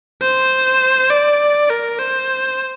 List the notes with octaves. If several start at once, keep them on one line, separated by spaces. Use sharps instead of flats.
C5
D5
A#4
C5